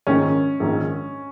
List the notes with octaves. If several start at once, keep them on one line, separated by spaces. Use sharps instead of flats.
A#1 G#2 D#3 C#4
A#1 G#2 D#3